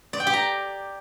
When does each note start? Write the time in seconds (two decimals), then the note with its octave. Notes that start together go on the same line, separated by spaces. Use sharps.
0.13 D5
0.20 G5
0.27 G4
0.33 A#5